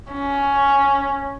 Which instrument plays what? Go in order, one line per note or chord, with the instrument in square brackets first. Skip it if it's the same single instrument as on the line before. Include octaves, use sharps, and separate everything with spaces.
[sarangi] C#4